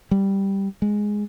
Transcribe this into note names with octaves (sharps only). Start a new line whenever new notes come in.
G3
G#3